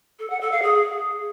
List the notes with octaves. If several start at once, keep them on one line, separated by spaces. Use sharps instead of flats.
A4
F#5
A4
F5
G#4